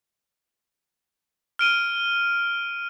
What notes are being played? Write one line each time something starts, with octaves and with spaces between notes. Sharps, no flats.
F6 D7 D#7